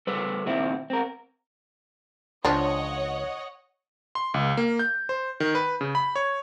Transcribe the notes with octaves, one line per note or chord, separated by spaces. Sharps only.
G3 A4 B4 C5
A#2 D#3 C4 E4
C4 A#4
C#2 F3 D4 C#5 D#5 F#5
C6
C#2
A#3
G6
C5
D#3
B4
C#3
B5
C#5